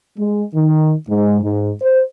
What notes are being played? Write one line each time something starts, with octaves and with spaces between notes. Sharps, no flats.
G#3
D#3
G#2
G#2
C5